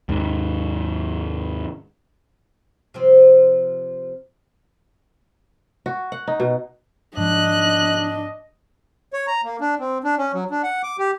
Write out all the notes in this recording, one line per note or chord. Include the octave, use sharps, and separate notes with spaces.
D#2 G#2
C3 F3 C4
F#4
F#5
D#4
B2
G#2 F3 D4 D#5 F#6
C#5
A#5
A#3
D4
C4
D4
C#4
F#3
D4
F#5
D6
G4